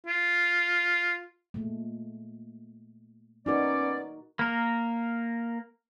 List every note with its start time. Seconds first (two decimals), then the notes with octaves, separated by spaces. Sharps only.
0.06 F4
1.54 A#2 G#3 A3
3.46 B3 C#4 D#4 F#4 A#4 D5
4.39 A#3 A#4